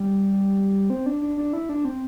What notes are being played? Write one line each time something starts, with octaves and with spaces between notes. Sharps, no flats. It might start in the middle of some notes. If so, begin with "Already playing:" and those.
Already playing: G3
C4
D4
D4
D4
E4
D4
C4